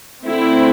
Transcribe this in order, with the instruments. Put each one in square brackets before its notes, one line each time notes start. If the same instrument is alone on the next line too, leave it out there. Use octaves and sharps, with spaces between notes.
[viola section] D3 A3 C4 E4